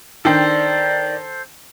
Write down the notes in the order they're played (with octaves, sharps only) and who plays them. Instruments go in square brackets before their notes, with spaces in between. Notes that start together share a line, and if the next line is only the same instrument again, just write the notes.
[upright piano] D#3 D4 G5 [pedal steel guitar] A4 C5 [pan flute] D5